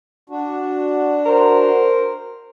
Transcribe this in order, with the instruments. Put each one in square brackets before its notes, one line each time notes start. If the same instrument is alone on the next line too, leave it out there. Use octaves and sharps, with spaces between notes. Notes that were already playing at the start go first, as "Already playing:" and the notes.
[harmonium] D4 F#4
[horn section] A#4 C5